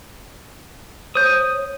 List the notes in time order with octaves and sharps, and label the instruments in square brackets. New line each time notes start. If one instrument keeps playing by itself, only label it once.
[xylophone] C5 G6 [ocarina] C#5 [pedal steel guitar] D#6